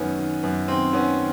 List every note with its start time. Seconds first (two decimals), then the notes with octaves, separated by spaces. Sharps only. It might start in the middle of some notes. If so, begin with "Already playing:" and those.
Already playing: F#2 D#3 B3 C#4
0.19 D#3
0.43 F#2 B3
0.68 D#3 C4
0.93 D#3 B3 C#4
1.17 D#3